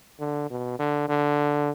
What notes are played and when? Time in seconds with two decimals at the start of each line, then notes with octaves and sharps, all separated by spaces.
0.20 D3
0.50 B2
0.79 D3
1.09 D3